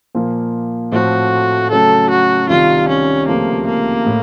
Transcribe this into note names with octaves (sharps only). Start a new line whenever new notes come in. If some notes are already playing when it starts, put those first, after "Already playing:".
A#2 F3 A#3
A2 F3 A3 C4 F#4
C#3 F#3 A3 A4
F#4
C2 C3 D#3 F4
C#4
C#2 C3 F3 A3 A#3
A#3
A2